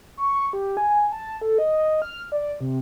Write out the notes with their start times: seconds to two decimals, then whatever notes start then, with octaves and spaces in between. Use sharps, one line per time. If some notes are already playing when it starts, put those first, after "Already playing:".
0.17 C#6
0.53 G4
0.77 G#5
1.12 A5
1.41 A4
1.58 D#5
2.02 F6
2.32 D5
2.61 C3